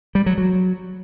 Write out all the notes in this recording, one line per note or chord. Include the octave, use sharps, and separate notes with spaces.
G3
F#3
F#3